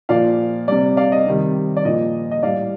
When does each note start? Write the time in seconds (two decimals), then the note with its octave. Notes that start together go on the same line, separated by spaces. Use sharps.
0.09 A#2 F3 D5 F5
0.68 C3 G3 D5
0.97 D5 F5
1.12 D#5
1.27 C3 D#3 G3
1.77 D5
1.85 A#2 F3 D#5
2.31 D#5
2.43 A2 G3 D5 F5